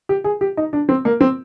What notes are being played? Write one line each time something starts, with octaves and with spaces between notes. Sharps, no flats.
G4
G#4
G4
D#4
D4
C4
A#3
C4